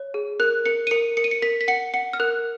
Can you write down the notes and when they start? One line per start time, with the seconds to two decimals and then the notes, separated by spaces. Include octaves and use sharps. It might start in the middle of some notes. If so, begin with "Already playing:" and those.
Already playing: C#5
0.14 G#4
0.40 A#4 F#6
0.66 A#4 C#7
0.87 D#7
0.91 A#4 C#7
1.17 A#4 C#7
1.24 D#7
1.31 C#7
1.42 A#4 B6
1.61 B6
1.68 F#5 C#7
1.94 F#5 C#7
2.13 F6
2.20 A#4 F#6